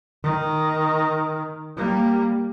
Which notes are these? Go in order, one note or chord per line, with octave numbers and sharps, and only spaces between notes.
D#3
G3 A#3